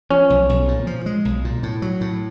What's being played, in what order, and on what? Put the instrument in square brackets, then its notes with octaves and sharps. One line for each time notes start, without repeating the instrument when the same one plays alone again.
[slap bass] F3 [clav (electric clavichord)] C#4
[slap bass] B1
B1
A#2
F3
G#3
B1
A#2
A2
F#3
A2